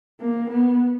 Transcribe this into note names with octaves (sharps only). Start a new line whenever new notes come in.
A#3
B3